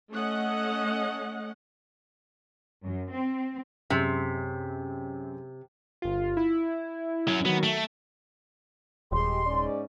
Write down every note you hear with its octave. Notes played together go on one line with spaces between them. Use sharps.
A3 C#4 D#5 F#5
F#2
C4
F#2 C3 G#3
G1 F4
E4
F#2 F#3
D#3 F#3 B3
A3 D7
D#1 G#3 G4 C6
G#2 C#4 D5